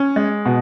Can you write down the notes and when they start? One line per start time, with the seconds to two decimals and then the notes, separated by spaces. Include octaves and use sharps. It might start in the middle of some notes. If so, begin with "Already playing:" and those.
Already playing: C#4
0.16 G#3
0.46 B2